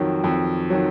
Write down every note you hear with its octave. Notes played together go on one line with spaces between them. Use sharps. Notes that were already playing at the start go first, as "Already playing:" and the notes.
Already playing: F2 D#3 F#3
F2
D#3 F#3